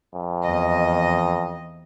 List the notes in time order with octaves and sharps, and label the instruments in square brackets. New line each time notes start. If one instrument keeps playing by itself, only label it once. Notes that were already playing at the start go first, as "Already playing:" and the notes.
[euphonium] F2
[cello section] E2 D#5